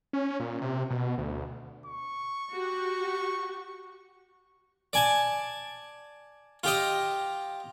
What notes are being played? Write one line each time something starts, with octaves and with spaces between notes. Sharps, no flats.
C#4
A#2
C3
B2
D2
C#6
F#4 G4
D5 G#5 A5
F4 G4 D#5